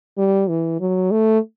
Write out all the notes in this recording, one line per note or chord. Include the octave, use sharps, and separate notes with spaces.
G3
E3
F#3
A3